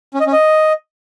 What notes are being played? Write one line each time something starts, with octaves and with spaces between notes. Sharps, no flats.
C#4
D#5
C#4
D#5